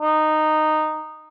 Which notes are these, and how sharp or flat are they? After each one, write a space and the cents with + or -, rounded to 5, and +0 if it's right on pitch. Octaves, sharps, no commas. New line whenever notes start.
D#4 -10